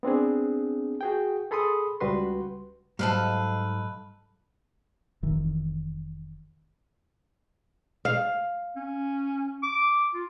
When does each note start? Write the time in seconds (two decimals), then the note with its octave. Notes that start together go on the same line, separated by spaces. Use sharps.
0.03 B3 C4 D4 G#4
1.01 F#4 G#4 G5
1.51 G#4 A4 B5 C6 D#6
2.01 C#2 G3 F#4 B4 C6
2.99 G#2 F#3 G3 A4 B4 D#5 F5
5.23 F1 D#3 E3
8.05 F5
8.76 C#4
9.63 D6
10.14 F4